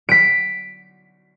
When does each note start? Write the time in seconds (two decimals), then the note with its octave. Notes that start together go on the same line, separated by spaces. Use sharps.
0.09 B6 D7